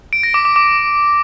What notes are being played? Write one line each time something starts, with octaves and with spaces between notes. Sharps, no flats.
D7
A#6
D6
D6
D6